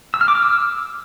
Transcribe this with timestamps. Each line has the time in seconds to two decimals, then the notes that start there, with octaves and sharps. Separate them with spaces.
0.14 E6
0.21 F6
0.28 D6
0.35 F6
0.42 E6